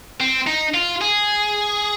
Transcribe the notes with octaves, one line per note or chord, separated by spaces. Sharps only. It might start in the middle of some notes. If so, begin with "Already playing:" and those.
C4
D#4
F4
G#4